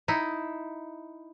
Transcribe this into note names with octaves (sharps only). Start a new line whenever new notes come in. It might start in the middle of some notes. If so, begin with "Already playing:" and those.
D#4 E4